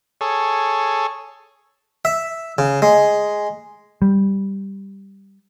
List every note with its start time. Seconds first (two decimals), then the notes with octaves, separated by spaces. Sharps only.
0.21 G#4 A4 C#5
2.05 E5
2.58 C#3
2.82 G#3
4.02 G3